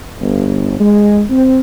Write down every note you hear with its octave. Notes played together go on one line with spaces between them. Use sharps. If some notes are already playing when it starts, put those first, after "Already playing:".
G1
G#3
C4